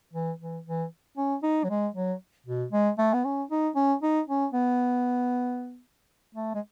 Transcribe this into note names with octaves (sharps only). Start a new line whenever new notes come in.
E3
E3
E3
C#4
D#4
F#3
G#3
F#3
B2
G#3
A3
B3
C#4
D#4
C#4
D#4
C#4
B3
A3
G#3